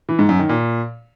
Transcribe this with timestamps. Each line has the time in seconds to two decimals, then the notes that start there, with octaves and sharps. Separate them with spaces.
0.09 E3
0.19 G#2
0.29 F#2
0.39 D#3
0.49 A#2